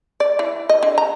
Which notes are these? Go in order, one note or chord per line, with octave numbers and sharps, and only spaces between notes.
D5
E3
D#5
D3
A#5